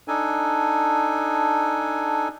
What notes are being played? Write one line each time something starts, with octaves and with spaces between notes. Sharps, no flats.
D4 D#4 A4 G#5